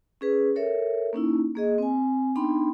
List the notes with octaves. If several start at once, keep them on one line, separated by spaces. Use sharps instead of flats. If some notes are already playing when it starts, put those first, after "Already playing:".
C#4 G#4 B4
A4 A#4 C#5 E5
A#3 C#4 D#4 E4
A#3 G#4 D#5
C4 G#5
B3 D4 D#4 G5 B5 C6